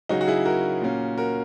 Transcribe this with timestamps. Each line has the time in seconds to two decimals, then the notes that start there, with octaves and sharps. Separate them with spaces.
0.09 C#3 F#3 C#4 D#4 F#4
0.21 F#4
0.27 E4 G#4
0.45 F#4 A#4
0.81 A#2 A#3 C#4
1.18 F#4 A#4